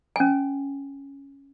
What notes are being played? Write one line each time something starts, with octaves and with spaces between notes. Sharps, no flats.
C#4 G#5